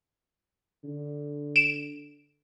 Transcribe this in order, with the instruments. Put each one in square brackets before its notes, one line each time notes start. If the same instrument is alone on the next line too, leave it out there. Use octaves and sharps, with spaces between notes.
[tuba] D3
[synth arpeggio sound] D7 E7